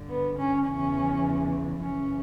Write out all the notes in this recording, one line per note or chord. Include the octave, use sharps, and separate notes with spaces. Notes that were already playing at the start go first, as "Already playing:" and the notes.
Already playing: G2 D3
B3
C#4
E2 C#3 E3 C#4
F#2 C#3 E3 C#4